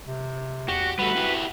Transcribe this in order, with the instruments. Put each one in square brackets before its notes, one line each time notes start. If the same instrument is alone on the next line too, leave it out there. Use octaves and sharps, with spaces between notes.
[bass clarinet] C3
[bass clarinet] E2 [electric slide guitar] F#4 [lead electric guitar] G4
[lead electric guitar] G3 A3 [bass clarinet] F#4 [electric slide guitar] B4
[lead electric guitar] E4 G4